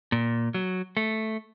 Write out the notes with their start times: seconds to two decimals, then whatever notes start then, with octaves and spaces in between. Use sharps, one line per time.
0.12 A#2
0.54 F#3
0.97 A3